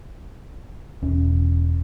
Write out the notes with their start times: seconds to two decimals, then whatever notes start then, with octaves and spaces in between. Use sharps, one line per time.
1.02 E1 E2 C#4